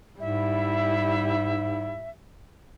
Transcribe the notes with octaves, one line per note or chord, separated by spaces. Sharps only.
G#2 G3 E4 E5